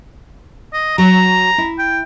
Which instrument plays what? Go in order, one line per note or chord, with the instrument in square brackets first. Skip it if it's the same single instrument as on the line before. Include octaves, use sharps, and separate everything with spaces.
[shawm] D#5
[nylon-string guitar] F#3 [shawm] A#5
[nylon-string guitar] E4
[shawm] G5